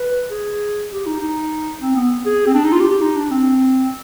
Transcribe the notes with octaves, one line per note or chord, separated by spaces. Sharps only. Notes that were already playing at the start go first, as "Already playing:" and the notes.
Already playing: B4
G#4
G4
D#4
D#4
C4
B3
G#4
C4
D4
D#4
F4
G4
G4
D#4
D4
C4